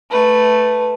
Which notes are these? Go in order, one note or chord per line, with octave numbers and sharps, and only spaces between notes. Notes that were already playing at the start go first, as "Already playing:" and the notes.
A3 B4